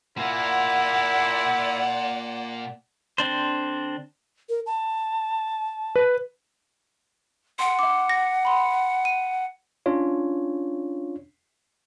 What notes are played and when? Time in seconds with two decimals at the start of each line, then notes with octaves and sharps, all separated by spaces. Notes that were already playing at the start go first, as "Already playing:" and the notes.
0.18 A#2 A#3 E4 D5 F#5
3.18 D3 C4 D4 C5
4.49 A#4
4.66 A5
5.96 B4
7.59 F#5 C6
7.79 E5 D6
8.09 A#6
8.45 B5 C6
9.05 D#7
9.86 C#4 D4 F4 C#5